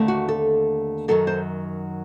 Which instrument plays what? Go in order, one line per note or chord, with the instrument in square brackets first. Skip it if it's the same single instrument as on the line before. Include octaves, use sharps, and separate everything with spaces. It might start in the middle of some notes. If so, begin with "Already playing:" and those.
Already playing: [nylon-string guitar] D#2 D3 A3 C4
F#4
A4
F#2 D#3 F#3 A4
C5